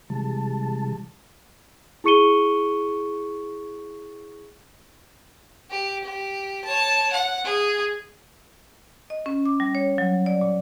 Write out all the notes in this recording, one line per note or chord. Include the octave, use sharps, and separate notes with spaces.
C3 E3 G3 G#3 A5
E4 G#4 C#6 C#7 D#7 G7
G4
G4
C#5 A5
F#5
G#4
D#5
C#4
D6
G3
C#5
F#3
D5
A#2